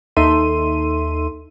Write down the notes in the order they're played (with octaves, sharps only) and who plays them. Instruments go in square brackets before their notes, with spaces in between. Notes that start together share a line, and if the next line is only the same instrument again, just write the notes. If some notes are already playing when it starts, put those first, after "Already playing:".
[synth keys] D#2 D#4 A4 E5 C6 D#7